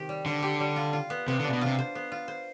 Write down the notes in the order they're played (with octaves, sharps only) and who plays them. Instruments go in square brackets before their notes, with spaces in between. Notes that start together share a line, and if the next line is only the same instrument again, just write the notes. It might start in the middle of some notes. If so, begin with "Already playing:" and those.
Already playing: [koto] C3 D#3 G4
G3
[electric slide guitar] D3 [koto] G3
[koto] G4
G3
F4
F4
B3
[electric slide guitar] C3 [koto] B3
[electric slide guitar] D3
[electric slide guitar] C3 [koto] D4
[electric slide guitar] B2
[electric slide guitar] C3 [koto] F4
[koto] C5
B3
F4
C5